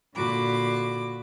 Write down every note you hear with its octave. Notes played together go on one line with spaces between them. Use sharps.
A#2 D3 F#4 B5 D6